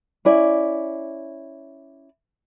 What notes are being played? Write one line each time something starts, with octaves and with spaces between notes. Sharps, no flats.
C#4 E4 D5